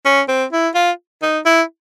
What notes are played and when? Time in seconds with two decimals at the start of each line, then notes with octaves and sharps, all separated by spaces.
0.05 C#4
0.28 C4
0.52 E4
0.75 F4
1.23 D#4
1.46 E4